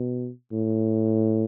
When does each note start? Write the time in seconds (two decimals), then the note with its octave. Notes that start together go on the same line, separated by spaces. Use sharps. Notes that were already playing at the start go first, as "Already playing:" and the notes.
Already playing: B2
0.52 A2